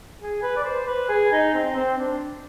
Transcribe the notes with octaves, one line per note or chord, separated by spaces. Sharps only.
G#4
B4
D5
C5
B4
G#4
D#4
C4
C4
D4